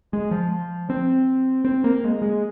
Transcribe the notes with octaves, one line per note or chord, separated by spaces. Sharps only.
G#3
F3
C4
C4
A#3
G#3
G#3